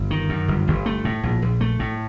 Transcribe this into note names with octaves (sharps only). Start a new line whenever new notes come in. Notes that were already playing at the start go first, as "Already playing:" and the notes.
Already playing: G1
D#3
F#2
G1
G1
A3
A2
A#1
A#1
A3
A2